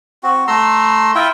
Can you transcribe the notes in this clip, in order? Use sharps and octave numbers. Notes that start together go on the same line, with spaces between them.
C4 F#4
A3 A#5 C6 E6
E4 F4 E5 G5